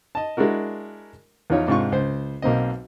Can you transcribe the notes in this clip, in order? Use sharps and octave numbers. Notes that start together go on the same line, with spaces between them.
D#5 A5
G#3 D4 E4 F#4 A#4
E2 F3 D#4 F4 C#5
G#2 C3 D4 F4 C#6
C#2 C5
B1 A#3 C4 D#5